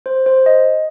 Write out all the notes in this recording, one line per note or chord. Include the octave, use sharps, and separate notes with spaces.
C5
C5
D#5